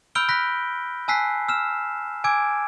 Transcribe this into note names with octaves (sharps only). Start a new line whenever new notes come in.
B5 E6 F6 G6 D7 G7
B5 F#6 A#6 B6
G#5 A5 E6 F#6 B6 C7
E6 F6 E7
G#5 D6 E6 G#6 D7